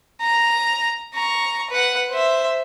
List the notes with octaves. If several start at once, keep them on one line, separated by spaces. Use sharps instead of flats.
A#5
A#5 C#6
B4 F#5
C5 E5